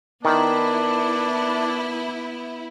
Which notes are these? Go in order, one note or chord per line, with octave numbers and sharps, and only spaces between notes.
D#3 B3 D4 E4